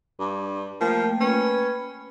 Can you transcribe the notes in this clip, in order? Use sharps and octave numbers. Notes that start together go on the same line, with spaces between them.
G2
F3 A3 A#3 A#4 G5
C#4 B4